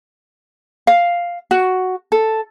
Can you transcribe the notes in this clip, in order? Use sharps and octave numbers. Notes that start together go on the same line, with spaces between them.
F5
F#4
A4